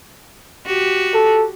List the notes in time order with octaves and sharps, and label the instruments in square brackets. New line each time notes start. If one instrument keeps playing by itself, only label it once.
[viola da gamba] F#4 G4
[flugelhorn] A4